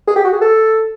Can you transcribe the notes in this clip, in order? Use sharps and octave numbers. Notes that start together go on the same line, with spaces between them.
G#4
G4
F#4
G#4
A4